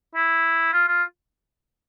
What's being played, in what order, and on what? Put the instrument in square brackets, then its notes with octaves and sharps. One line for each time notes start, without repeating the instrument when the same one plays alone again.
[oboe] E4
F4
F4